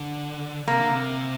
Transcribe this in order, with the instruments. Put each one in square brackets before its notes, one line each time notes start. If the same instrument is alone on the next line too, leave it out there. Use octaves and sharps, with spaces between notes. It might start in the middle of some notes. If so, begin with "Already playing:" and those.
Already playing: [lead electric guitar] D3
[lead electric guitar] C3 [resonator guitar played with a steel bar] A#3
[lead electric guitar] D3
C3